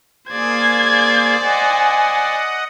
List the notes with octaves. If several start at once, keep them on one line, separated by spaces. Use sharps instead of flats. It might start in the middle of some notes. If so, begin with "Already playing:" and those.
A#3 G#4 C5 D5 G#6
D#5 F#5 G#5